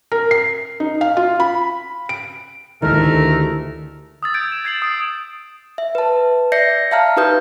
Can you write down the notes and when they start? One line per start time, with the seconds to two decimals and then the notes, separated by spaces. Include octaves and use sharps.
0.12 A#4
0.31 C7
0.80 D#4
1.01 F5
1.17 F4
1.40 B5
2.09 D7
2.82 D2 D#3 A3 E4 G4 A#4 A#5
4.23 D#6 E6 A6
4.34 G6 G#6 D7
4.52 E7
4.65 G#6 A6 C7 D7 F#7
4.82 D#6 A6 D7
5.78 E5
5.95 B4 A5
6.52 D5 E5 G6 A#6 C7 C#7
6.91 E5 F5 A5 A#5 F6
7.17 D#4 G4 B4 D#6 G6